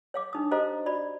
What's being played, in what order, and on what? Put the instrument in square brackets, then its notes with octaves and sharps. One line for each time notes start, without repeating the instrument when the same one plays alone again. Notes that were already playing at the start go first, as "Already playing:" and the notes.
[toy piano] C#5 F5 D6
D4 D#4 D#6
G4 A4 C5 D#5 F5 A#5
F#4 D5 B5